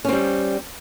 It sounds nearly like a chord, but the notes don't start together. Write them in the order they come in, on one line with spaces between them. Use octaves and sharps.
C#4 C4 G3